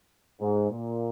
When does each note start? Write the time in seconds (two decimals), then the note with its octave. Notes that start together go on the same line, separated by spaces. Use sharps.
0.41 G#2
0.71 A#2